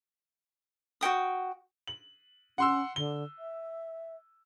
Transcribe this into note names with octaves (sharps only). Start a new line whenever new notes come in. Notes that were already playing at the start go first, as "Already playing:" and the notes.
F#4 C#5 G5 D#6
F#7
C#4 F#5 C6 E6
D3 G7
E5